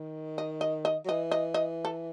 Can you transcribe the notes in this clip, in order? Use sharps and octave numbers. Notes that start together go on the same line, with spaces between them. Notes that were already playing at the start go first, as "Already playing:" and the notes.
Already playing: D#3
D#5
D#5
D#5
F#3
E3 D#5
D#5
D#5
A4